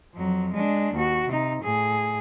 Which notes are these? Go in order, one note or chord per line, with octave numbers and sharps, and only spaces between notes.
F2 F#3
G#3 D4
D#2 F#4
C3 D#4
A2 G#4